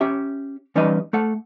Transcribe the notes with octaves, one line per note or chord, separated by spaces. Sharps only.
C#4 G4 E5
E3 G3 C#4 D#4 B4 D#5
A3 A4 F#5